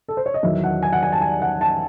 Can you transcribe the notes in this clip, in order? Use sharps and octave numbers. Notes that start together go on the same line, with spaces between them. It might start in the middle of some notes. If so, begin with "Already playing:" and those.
A4
C5
C#5
D#5
E2 D#3 F#3 E5
F#5
G#5
F#5
G#5
A5
G#5
F#5
A5